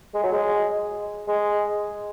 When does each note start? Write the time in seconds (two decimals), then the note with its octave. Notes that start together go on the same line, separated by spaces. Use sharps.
0.14 G#3
0.24 F#3
0.33 G#3
1.28 G#3